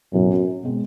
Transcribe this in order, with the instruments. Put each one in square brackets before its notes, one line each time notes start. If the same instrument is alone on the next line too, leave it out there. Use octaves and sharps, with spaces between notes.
[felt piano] B1 A2 F#3 B3 [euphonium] F#2
[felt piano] B2 G#3 C4